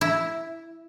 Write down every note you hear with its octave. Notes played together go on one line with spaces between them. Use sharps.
E4